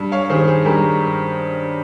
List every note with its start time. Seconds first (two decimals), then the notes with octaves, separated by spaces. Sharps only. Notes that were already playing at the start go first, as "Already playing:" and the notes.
Already playing: G2
0.12 C#5 F5
0.30 D#3 G3 G#4 C5
0.47 G#4
0.65 G2 G4 A#4